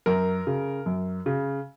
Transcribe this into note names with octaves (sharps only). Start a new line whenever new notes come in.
F#2 A#4
C#3
F#2
C#3